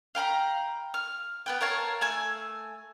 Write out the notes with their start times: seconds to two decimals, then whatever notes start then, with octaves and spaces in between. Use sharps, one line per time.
0.15 F5 G5 A#5 B5
0.94 F6
1.46 B3 B4 G5
1.61 A#4 C#5 F5 A5
2.01 A3 G#5 E6